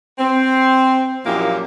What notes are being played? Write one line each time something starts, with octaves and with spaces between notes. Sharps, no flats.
C4
F#2 A#2 F3 A#3 E4 G4